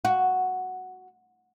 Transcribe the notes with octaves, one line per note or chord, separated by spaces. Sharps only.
F#4